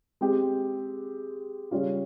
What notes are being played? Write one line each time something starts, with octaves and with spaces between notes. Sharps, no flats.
G#3 C4 G4
C#3 G3 C#4 F4